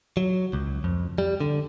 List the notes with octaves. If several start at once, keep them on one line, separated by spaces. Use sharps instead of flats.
F#3
C#2
F2
G3
D3